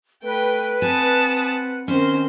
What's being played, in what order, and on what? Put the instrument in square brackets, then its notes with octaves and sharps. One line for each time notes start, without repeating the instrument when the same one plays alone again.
[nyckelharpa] A3 [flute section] B4 [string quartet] G5
[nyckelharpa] C4 F#5 [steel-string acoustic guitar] G#5 [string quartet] A5 D#6
[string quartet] D#3 C5 C6 [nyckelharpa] C4 A#4 [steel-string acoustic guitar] C#4